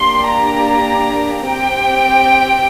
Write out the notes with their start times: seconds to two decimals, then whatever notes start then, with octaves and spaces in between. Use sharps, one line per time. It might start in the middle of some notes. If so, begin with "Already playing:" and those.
Already playing: A#3 D4 G4 C6
0.32 A#5
1.47 C4 G4 G5